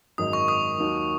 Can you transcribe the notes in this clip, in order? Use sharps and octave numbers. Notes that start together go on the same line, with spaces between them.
G#1 F#2 D#3 G#3 D#4 D#6
C#6
D#6
D#2 D#3 F#3 D#4